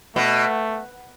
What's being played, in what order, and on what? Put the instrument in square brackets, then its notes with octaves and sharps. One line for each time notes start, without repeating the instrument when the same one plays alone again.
[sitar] B2 [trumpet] A3